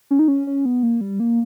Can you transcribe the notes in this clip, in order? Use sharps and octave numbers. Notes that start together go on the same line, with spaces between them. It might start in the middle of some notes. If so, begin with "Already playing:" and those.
C#4
D#4
C#4
C#4
B3
A#3
G3
A#3